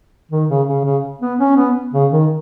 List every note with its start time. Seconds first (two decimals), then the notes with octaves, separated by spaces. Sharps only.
0.31 D#3
0.49 C#3
0.68 C#3
0.85 C#3
1.21 B3
1.39 C#4
1.57 B3
1.93 C#3
2.12 D#3